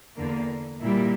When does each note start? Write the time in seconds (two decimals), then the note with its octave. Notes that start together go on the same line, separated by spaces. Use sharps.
0.16 E2 D3 A#3
0.83 A#2 G3 A#3 E4